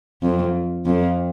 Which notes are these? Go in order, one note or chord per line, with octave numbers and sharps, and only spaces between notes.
F2
F2